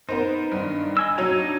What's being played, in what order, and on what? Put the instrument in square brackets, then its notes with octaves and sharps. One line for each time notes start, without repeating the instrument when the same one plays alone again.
[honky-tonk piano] B3 A#4 C5 [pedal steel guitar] D#4
[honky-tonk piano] G2 D#3
[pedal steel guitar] D#5 G#5 E6
[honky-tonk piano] F#3 C#5 G#6 [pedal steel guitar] D4 D#4 A#5